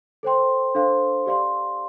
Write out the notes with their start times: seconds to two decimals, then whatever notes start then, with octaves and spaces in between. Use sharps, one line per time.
0.23 A4 C5 G5 C6
0.75 D4 A4 C5 F5 C6
1.26 G4 D5 F5 C6